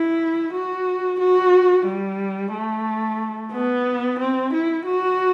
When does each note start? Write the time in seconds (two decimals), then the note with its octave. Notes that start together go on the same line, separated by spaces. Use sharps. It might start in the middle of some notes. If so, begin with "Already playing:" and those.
Already playing: E4
0.53 F#4
1.20 F#4
1.86 G3
2.53 A3
3.52 B3
4.19 C4
4.53 E4
4.86 F#4